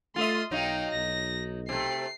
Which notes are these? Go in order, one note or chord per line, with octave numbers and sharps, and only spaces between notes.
A3 F4 E5 C6 D#6
B1 F#3 D#4 F5 G5
B1 A#6
C3 A3 C7